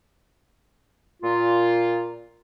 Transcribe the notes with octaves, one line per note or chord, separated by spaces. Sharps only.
A#2 F4